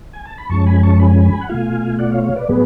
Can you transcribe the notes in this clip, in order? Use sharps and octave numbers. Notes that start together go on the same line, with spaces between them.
G#5
A5
B5
F#2 F3 G#3 C#4 A5 C#6
G#5 B5
A5 C#6
G#5 B5
F#5
B2 A3 F4 F5 G#5
D5 F#5
C#5 F5
C#5 F5
B4 D5
A2 F#3 B3 G#4 B4